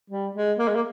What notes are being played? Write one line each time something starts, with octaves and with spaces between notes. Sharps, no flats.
G3
G#3
A#3
G#3
A#3